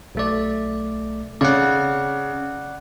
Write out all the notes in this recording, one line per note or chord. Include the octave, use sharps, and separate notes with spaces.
B1 A3 D5
C#3 D5 F#5